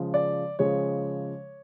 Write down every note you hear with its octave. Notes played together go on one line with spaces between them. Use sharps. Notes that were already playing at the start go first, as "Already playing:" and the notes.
Already playing: C#3 F3 G#3
D5
C#3 F3 G#3 C#5